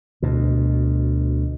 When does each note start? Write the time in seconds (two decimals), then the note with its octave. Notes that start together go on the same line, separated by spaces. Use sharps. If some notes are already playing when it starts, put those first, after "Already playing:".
0.22 D2 B2